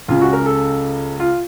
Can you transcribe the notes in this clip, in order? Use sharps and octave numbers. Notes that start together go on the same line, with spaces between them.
C#2 C#3 F4
F#4
A#4
A4
F4